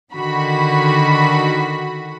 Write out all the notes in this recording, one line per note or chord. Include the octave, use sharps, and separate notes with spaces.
D3 D#3 F#4 B5